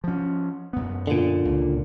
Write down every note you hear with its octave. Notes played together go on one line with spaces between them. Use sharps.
F3 C#4
F#2 B3
A#2 D3
C#2